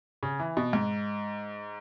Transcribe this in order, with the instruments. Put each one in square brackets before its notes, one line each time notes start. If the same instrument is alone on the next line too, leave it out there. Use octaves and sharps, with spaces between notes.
[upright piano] C#3
E3
B2
G#2